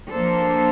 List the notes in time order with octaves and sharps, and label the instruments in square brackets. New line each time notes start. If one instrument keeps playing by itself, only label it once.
[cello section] F3 A#3 D4 A4 C5